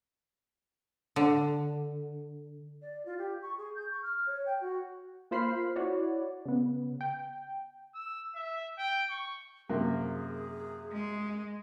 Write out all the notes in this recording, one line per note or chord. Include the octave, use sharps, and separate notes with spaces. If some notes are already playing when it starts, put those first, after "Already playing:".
D3
D5
F4
G4
C#6
G#4
G6
C#6
F6
C#5
G5
F#4
A#3 F4 C5 B5 F6 C7
E4 F#4 C#5 D5
C#3 B3
G5
E6
E5
G5
C#6
F#2 C3 A#3 G#4
G#3